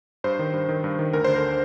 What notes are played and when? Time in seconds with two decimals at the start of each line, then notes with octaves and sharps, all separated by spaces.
0.24 G2 C5
0.39 D#3
0.54 G2
0.69 D#3
0.84 G2
0.99 D#3
1.13 D2 A#4
1.24 D3 C5
1.36 A#4